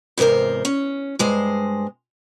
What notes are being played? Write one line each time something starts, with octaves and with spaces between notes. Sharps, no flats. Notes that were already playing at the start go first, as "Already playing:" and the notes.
E2 G#2 C3 A#4 C5
C#4
G2 G#3 C5